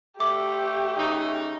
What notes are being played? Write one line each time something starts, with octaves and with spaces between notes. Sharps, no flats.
A3 G4 D6
C#3 D#4